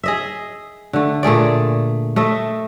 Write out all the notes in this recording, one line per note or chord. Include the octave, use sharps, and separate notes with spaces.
G#4 D#5 E5
D3 A3
A#2 A3 G#4 D5
A3 D#5 E5